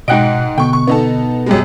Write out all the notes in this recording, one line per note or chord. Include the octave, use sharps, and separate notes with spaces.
G#2 B2 D#5 F#5 G5 F#6 D7
B2 D3 G5 C#6
C#6
B3 D#4 A4
F#2 G3 G#3